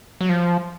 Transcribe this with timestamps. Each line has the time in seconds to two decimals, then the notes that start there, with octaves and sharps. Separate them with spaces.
0.21 F#3
0.29 F3